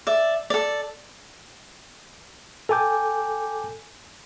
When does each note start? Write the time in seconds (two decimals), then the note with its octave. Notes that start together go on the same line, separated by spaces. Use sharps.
0.07 D5 E5
0.50 A4 D5
2.69 A4 G5 G#5 D6 G6